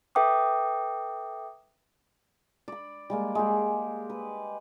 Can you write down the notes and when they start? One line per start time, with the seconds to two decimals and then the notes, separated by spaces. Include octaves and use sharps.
0.15 A4 B4 E5 G5 D6 D#6
2.68 D5 B5
3.10 G3 G#3 A#3
3.35 G#3 G4
4.10 B4